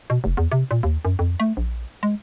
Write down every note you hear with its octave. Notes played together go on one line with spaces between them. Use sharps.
B2
F1
E2
C3
A#2
D#2
F#2
F2
A3
A#1
G#3